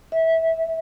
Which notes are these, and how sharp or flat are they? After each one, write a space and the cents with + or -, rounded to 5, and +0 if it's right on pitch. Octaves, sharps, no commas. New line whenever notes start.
E5 -20